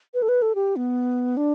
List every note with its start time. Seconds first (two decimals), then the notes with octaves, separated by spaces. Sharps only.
0.14 B4
0.22 A4
0.29 B4
0.42 A4
0.55 G4
0.76 B3
1.37 D4